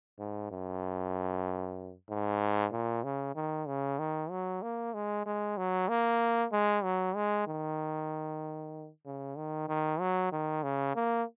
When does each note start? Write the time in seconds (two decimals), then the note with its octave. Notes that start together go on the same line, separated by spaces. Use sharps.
0.19 G#2
0.51 F#2
2.09 G#2
2.72 A#2
3.04 C#3
3.35 D#3
3.67 C#3
3.99 D#3
4.31 F#3
4.62 A#3
4.94 G#3
5.26 G#3
5.58 F#3
5.89 A#3
6.52 G#3
6.83 F#3
7.15 G#3
7.47 D#3
9.06 C#3
9.37 D#3
9.68 D#3
10.00 F#3
10.32 D#3
10.63 C#3
10.95 A#3